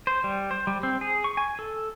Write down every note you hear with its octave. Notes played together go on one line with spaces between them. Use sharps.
C5
G3
C5
G3
C4
G#4
C#6
G#5
A4